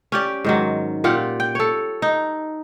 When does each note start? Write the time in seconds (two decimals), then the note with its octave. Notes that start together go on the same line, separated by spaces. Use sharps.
0.12 C#4 G4 D5
0.44 G#2 D#3 F#3
1.04 A#2 F4 G4 F#5
1.40 G5
1.55 A4 C#5
2.02 D#4